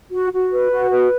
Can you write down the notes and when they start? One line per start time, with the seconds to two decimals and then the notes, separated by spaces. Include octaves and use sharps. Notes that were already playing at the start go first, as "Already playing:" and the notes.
0.12 F#4
0.32 F#4
0.52 B4
0.70 F#4
0.90 B4